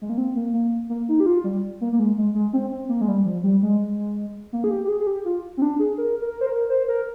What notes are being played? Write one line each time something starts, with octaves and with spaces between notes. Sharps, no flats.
G#3
A#3
C4
A#3
A#3
A#3
D#4
G4
F4
G3
A#3
A#3
G#3
G#3
G#3
C4
C4
A#3
G#3
G3
F3
G3
G#3
A#3
G#4
G4
G4
G#4
G#4
G4
F4
C4
D4
G#4
A#4
A#4
C5
A#4
C5
A#4